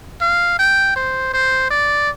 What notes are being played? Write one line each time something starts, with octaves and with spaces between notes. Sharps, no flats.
F5
G5
C5
C5
D5